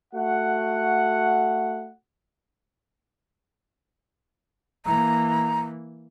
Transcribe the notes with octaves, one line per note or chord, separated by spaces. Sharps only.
A3 F#4 F#5
E3 A#3 A#5